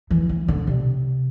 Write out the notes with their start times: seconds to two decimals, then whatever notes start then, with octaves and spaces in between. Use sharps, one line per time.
0.11 E3
0.29 E3
0.48 D3
0.67 C3